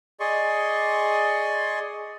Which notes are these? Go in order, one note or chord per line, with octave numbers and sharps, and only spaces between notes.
G#4 D5 D#5 C6 C#6